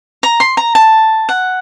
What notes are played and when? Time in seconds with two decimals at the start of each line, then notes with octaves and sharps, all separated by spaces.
0.23 A#5
0.40 C6
0.57 A#5
0.75 A5
1.29 F#5